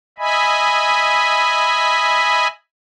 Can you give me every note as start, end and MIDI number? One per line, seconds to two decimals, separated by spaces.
0.18 2.47 75
0.18 2.47 76
0.18 2.47 80
0.18 2.47 83